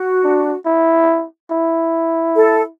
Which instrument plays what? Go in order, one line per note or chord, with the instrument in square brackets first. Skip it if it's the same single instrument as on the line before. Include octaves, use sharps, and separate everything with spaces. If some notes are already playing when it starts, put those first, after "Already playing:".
Already playing: [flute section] F#4
[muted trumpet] D4
E4
E4
[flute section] A4